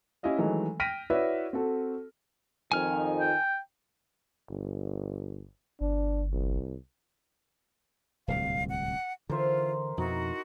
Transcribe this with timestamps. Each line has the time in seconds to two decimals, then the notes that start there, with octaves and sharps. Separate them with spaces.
0.23 C#4 E4 G4 D#5 F5
0.38 D#3 E3 F#3 G#3 A3
0.80 G5 F6 A#6 B6 D7 D#7
1.10 E4 F#4 B4 C#5 D5 E5
1.53 C4 F#4 A4
2.72 F2 D#3 G#5 F6
3.20 G5
4.49 G1
5.81 G1 D4
6.33 C2
8.28 D1 C2 A#2 F5
8.69 F#5
9.30 D3 E3 F4 A#4 C5 E5
9.98 F2 B2 D#4 E4 F#4